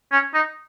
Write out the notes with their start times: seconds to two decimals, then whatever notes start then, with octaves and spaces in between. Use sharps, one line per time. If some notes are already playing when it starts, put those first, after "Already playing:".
0.12 C#4
0.34 D#4